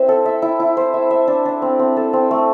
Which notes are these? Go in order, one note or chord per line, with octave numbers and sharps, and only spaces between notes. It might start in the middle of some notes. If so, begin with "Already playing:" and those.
Already playing: C4 E4 C5 E5
A4
E5
E4
E4
C5
E5
E5
D4
D4
C4
C4
A4
C4
A3